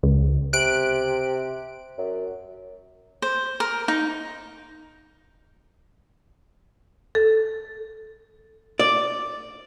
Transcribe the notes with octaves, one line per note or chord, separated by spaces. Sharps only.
C#2
C3 F#6 D7
F#2
C5
A#4
D#4
A4
D5